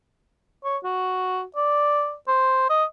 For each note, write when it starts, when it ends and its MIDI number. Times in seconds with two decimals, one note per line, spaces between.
0.64 0.78 73
0.84 1.44 66
1.56 2.14 74
2.28 2.68 72
2.70 2.84 75